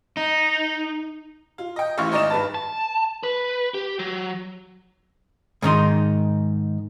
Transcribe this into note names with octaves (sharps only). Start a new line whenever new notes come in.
D#4
F4
D#5 G5
A1 E4 F5 C#6 F6
G#1 D#4 D5 D#5 E7
G2 B4 A5
A5
B4
G4
F#3
G#2 D#3 D#4 C6